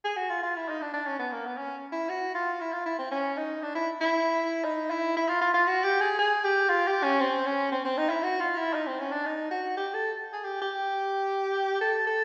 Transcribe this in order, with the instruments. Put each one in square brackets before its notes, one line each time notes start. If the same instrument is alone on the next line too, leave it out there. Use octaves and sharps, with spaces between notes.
[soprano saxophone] G#4
F#4
F4
F4
E4
D#4
D4
D4
C#4
B3
A#3
B3
C#4
E4
F#4
F4
E4
F4
E4
C4
C#4
D#4
D4
E4
E4
D#4
E4
E4
F4
F4
F4
F#4
G4
G#4
G#4
G4
F4
G4
C#4
C4
C#4
C4
C4
D#4
E4
F#4
F4
E4
D#4
C4
C#4
D4
D#4
F#4
G4
A4
G#4
G4
G4
A4
A4